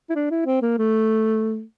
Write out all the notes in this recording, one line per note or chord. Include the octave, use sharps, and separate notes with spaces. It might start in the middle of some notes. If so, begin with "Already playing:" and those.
E4
D4
E4
C4
A#3
A3